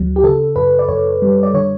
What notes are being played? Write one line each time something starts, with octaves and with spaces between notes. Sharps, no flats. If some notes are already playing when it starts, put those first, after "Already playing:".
Already playing: D2 F#3 F#4
G4
C#3 A4
F#2 B4
D5
F#2 C#5
G3
D5
D3 C#5